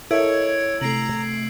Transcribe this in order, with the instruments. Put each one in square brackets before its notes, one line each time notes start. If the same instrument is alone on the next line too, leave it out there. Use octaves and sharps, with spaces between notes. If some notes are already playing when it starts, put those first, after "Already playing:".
[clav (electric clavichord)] E4 [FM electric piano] A4 A#4 D#5 [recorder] C#5 [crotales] E6 G#6 D7
[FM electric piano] C3 A3 [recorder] A#5 [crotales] C7 D7 F#7